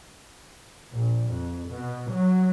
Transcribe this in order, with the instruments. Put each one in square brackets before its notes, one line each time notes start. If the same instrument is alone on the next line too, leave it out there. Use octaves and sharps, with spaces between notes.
[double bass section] A#1
F2
B2
F#3